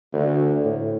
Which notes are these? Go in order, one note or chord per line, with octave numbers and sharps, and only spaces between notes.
D2
A2